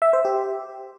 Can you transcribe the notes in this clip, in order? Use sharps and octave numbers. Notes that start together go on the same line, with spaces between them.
E5
C5
G4